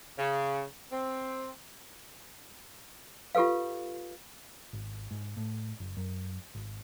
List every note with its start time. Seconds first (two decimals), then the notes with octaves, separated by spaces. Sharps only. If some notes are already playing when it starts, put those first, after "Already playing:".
0.18 C#3
0.92 C4
3.35 F4 G4 A4 B4 F5
4.73 G#1
5.11 G#2
5.37 A2
5.80 F#1
5.97 F#2
6.55 G#1